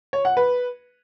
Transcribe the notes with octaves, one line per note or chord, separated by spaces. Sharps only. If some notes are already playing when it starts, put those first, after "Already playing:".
C#5
F#5
B4